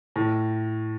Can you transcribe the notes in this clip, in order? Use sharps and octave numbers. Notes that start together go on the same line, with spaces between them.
A2